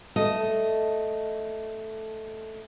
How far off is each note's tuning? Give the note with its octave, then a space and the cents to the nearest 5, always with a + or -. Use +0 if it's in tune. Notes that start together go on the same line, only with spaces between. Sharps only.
A3 +0 D#5 +0